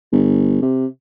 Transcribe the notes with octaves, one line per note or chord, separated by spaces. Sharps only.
G1
C3